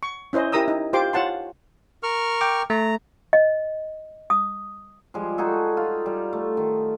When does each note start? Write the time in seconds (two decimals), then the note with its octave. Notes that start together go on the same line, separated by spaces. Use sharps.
0.03 C#6
0.33 C#4 E4 C5 D#5
0.52 E4 G4 A#4 A#5 D#6 E6
0.68 D#4
0.93 F4 G4 C5 C6 D6
1.13 F4 C#5 F#5 A5 C6
2.03 A#4 C#6 F6
2.41 G5 D6
2.70 A3 A#5
3.33 D#5
4.30 D#6
5.14 F3 G3 G#3
5.38 D#4 F#4 G#4 A4
5.77 F4
6.06 G3
6.33 A3
6.57 D#3